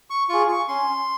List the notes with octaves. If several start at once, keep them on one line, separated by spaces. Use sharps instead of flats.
C#6
F4 G#4 C#6
C#6
C#4 C6